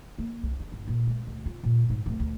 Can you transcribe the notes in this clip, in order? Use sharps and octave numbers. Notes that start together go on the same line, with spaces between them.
A#3
C2
D4
G1
A#2
G#3
D2
F4
A#2
G#2
D1
D2